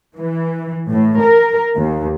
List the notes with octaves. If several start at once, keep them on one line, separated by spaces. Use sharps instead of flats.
E3
A2
A#4
D#2